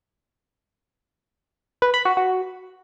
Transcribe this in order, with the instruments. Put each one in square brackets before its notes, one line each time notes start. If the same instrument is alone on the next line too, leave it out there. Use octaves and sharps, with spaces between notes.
[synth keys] B4
B5
F#4
F#4